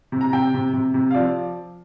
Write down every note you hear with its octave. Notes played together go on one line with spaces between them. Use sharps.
C3
A#5
C3 G5
C3
C3
C3
F5
F3 D5